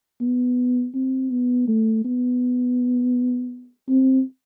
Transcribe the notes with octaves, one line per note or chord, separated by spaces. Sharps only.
B3
C4
B3
A3
B3
C4